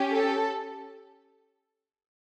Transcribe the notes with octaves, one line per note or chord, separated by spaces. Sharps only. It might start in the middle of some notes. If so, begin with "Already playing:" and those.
Already playing: C#4 G4
A4